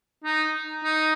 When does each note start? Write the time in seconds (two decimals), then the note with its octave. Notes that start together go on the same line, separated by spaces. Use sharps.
0.24 D#4
0.84 D#4